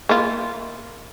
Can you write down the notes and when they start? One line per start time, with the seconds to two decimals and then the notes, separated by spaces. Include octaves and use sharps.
0.09 A#3 E4 F4